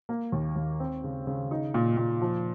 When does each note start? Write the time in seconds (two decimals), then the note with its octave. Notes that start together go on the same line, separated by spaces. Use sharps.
0.09 A#3
0.32 D#2
0.56 D#2
0.80 C4
1.04 C#3
1.27 C#3
1.51 D#4
1.74 A#2
1.97 A#2
2.22 F3